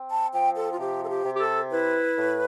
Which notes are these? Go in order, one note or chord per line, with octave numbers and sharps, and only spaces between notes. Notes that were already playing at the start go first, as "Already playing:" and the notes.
Already playing: C4
A5
F3 G5
A4
F4
C3 G4
A4
G4
C3
G4
A4
E4 B4
A2